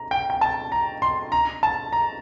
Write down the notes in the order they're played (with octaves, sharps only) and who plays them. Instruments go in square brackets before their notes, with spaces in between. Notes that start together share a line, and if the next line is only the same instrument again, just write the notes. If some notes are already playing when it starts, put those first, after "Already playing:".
Already playing: [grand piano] A#5
G5
G5
A5
A#5
C6
A#5
A5
A#5